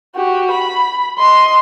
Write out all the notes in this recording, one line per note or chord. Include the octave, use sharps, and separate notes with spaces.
F#4 G4
B5
D#5 C6